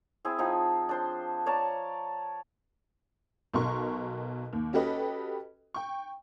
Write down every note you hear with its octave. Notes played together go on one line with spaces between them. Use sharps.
C4 E4 G#4
F3 C4 D#4
D4 C5 C6
C#5 D5 A5 A#5
B1 B2 A#4 C6 C#6
D#2
C#4 F#4 G4 A4 B4 D#5
G5 C#6